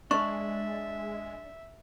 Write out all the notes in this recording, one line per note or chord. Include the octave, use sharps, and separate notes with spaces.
G#3 D4 B4 E5 C#6